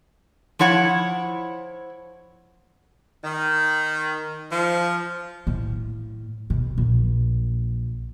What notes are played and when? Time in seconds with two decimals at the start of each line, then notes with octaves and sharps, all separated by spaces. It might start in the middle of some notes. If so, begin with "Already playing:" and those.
0.59 F3 E4 C#5 F#5
3.24 D#3
4.51 F3
5.47 A2
6.50 B2
6.78 A#1